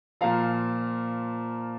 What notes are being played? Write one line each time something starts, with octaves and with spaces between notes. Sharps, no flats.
A#2 F3 F5 A#5